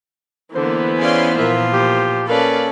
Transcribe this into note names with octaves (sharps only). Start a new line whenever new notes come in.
D3 E3 A#3 B3 C5
C#4 G#4 D5 F5 C6
A#2 F3 A#3 F4 E5
G4 C5
A#3 C#4 A4 B4 D5 F5